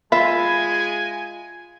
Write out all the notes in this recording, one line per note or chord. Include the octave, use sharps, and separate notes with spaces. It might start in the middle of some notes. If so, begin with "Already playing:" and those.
G#3 F4 E5 G#5 B5